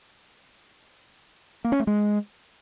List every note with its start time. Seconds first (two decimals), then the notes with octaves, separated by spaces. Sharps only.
1.64 A#3
1.72 C#4
1.80 A3
1.87 G#3